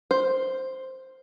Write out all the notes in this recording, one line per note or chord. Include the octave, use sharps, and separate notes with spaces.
C5